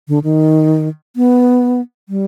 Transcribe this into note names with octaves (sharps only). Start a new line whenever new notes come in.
D3
D#3
B3
G3